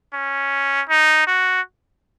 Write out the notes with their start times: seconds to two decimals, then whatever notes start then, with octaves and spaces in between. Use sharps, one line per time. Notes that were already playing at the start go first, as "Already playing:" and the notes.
0.14 C#4
0.89 D#4
1.27 F#4